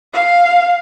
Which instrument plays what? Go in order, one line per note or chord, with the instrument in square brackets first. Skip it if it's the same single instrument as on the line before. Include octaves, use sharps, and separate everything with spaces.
[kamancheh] F5